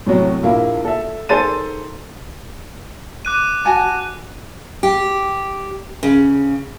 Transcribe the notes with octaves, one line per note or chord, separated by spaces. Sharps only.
A2 C3 F#3
A#1 A#3 E4
A4 E5
D#3 G#4 A4 C5 A6 D#7
D6 F#6 D#7
F#4 G#5 A5
G4
C#3